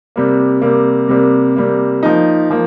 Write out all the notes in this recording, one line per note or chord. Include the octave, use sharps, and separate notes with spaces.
C3 G3 A#3
C3 G3 A#3
C3 G3 A#3
C3 G3 A#3
F3 A#3 D#4
F3 A#3